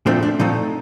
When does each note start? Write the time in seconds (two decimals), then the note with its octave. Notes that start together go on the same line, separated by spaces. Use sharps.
0.06 A#2 F3 A3 C4 D4
0.23 D4
0.39 A#2 F3 A3 C4 D#4